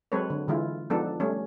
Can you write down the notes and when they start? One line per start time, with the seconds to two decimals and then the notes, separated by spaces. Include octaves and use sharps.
0.12 F#3 G#3 C4 A4 B4 C#5
0.30 D3
0.48 D3 E3 G#3 E4 F4
0.90 F3 G#3 B3 D4 D#4 A4
1.20 G3 A3 C#4